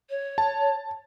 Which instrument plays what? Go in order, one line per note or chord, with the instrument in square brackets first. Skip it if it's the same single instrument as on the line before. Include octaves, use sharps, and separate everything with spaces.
[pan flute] C#5
[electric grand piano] A5